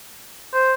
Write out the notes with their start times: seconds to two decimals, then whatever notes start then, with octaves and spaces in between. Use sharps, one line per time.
0.54 C5